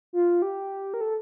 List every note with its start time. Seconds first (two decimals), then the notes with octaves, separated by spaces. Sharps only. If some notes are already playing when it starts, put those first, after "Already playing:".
0.13 F4
0.42 G4
0.94 A#4
1.01 A4